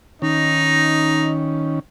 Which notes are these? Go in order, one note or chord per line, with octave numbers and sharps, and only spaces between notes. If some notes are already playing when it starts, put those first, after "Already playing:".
D#3 C#4 D#4